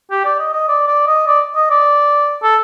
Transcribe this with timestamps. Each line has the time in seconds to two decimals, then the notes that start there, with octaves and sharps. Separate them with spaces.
0.11 G4
0.25 D5
0.39 D#5
0.53 D#5
0.68 D5
0.88 D5
1.07 D#5
1.27 D5
1.56 D#5
1.70 D5
2.43 A4